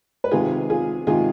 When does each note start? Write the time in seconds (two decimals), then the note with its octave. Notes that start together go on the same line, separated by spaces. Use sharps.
0.24 B4
0.31 C3 D#3 G#3 F4 G#4
0.70 F4 G#4
1.07 C3 D#3 G#3 F4 G#4